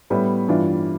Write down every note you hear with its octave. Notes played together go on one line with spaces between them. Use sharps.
A2 G3 B3
G2 E3 G3 D4 F4